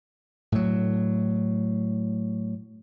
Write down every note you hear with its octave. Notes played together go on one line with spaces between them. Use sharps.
A2 F#3